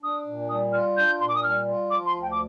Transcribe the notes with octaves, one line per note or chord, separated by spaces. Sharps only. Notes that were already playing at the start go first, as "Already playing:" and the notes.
D4 D#6
A#2
G3 D#6
F4 F6
D4 G6
A#2 C6
D6
D#6
G3 F6
F4
F3 D6
C6
D2
G5
D6